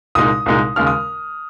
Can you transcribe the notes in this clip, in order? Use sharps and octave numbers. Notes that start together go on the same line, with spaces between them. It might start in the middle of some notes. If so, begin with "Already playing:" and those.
C2 A#2 G#3 D#4 D#6
C2 A#2 G#3 D#4
D#2 C#3 G#3 F6
D#6